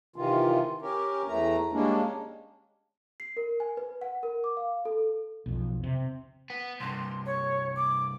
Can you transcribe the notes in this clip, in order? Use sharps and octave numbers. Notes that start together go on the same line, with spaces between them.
C3 D#3 E3 F4
C#4 G4 A#4
E2 A2 E3 A3 A#5
G3 G#3 A#3 C#4 D4
C7
A#4
G#5
B4
F#5
A#4
D6
F5
A4
B1 F2
C3
B3
C2 G2 C6
C#5
D6